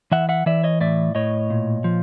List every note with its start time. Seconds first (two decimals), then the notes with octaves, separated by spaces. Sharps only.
0.11 E3 E5 F#5
0.29 E5 F#5
0.46 E3 D5 E5
0.63 C#5 D#5
0.80 A2 D5 E5
1.15 A2 C#5 D#5
1.50 A#2
1.84 F3